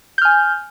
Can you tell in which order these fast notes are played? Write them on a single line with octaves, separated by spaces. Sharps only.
G6 F6 G#5